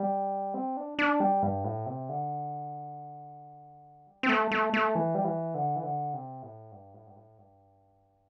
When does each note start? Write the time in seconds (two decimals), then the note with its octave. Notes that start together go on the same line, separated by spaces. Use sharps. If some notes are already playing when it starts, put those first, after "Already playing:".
Already playing: G3
0.54 C4
0.77 D4
0.99 D4
1.20 G3
1.43 G2
1.64 A2
1.86 C3
2.09 D3
4.07 G3
4.23 C4
4.29 A3
4.51 A3
4.74 A3
4.95 E3
5.15 G3
5.25 E3
5.54 D3
5.76 E3
5.83 D3
6.13 C3
6.43 A2
6.72 G2
6.94 A2
7.07 G2
7.16 A2
7.38 G2